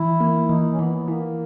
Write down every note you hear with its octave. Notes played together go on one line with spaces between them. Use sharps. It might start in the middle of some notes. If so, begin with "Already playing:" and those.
Already playing: E3 E4
A#3
E3 D#4
C#4
E3 B3
E3 A#3